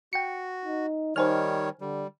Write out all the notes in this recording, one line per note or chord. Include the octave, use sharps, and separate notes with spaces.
F#4 G5 C#7
D#4
D#3 G3 D#4 C5 C#5 G#5 F6
D3 G3